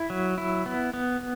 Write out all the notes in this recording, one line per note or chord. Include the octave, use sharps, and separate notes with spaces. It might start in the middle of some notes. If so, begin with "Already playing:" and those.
Already playing: E4
F#3
E4
B3
B3